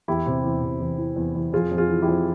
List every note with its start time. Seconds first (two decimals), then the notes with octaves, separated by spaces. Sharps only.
0.08 E2 E4 G4
0.26 C3
0.44 E2
0.62 C3
0.80 E2
0.98 E3
1.16 E2
1.35 E2
1.53 F2 F4 G#4
1.71 F2
1.77 F4 G#4
1.90 E3
2.02 E4 G4
2.08 F2